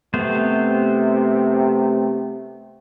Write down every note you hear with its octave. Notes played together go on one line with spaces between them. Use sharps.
C3 A3 B3 C5